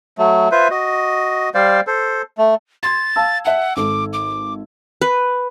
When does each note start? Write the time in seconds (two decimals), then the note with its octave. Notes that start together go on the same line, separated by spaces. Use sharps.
0.18 F#3 A3
0.52 F4 B4 C5 E5
0.71 F#4 D#5
1.54 G3 C5 D5 F5
1.87 A4 C5
2.38 A3
2.83 C6 G#6 A6
3.16 F5 A5 E6
3.45 E5 F#5 A5
3.77 G#1 A4 D6
4.13 D6
5.01 B4